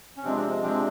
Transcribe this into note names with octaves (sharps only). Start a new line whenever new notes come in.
C#4
C3 F3 G#3 C4 D4
C4
C3 F3 G#3 C4 D4